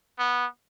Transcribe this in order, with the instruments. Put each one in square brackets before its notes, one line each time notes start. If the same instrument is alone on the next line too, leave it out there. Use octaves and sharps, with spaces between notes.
[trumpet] B3